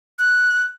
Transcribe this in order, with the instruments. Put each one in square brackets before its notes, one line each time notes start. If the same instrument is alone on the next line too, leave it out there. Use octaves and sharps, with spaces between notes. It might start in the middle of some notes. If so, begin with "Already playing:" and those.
[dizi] F#6